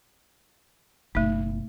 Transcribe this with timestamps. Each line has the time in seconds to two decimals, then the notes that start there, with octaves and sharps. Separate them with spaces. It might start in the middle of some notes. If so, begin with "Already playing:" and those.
1.15 F#1 B2 A3 D#4